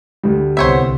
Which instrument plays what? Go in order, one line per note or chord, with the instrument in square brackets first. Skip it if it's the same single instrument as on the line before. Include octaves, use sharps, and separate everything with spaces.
[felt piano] D2 G3
[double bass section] C2 [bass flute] B3 [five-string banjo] C5 C#5 E5